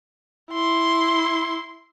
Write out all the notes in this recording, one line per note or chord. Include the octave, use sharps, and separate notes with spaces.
E4 C6